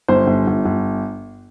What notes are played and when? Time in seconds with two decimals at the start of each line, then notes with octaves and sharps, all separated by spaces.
0.08 G1 C5
0.27 G1
0.47 G1
0.65 G1